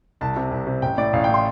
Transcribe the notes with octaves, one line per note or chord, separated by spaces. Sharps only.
C2 A5
C3
C2
C3
A1 G5
A2 D5
A1 F5
G5
A2
C6